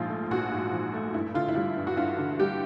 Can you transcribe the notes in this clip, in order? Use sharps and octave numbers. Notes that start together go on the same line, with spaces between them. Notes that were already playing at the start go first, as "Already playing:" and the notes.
Already playing: A#1 G#2 F3 F4
A3
A#1 F#4
G#2
F3
A3
G2 E4
D3 F4
E4
G3 F4
G2
F#4
G2 F4
D3
G3 G4